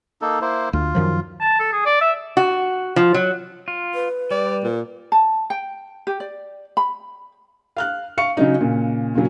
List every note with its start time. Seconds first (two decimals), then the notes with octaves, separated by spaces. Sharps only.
0.22 A#3 D#4 A4
0.41 A#3 E4 C5
0.73 D2 F4
0.95 F#2 D#3 F3
1.41 A5
1.60 A4
1.73 G#4
1.86 D5
2.01 E5
2.37 F#4
2.96 F3
3.14 F#3
3.68 F4
3.95 B4
4.31 G3 D5
4.63 A#2
5.12 A5
5.50 G5
6.07 G4
6.20 D5
6.77 B5
7.77 F5 F6 F#6
8.18 F5 C#6 C#7
8.37 C#3 F#3 D#4
8.61 A#2 C#3
9.15 A#2 C#3 F#3